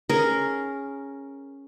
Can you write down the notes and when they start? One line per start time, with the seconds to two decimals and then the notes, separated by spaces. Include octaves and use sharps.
0.09 C#4 G#4 A#4